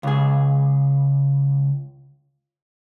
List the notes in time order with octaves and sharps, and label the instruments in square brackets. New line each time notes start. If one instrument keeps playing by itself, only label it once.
[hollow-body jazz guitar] C#2 G#4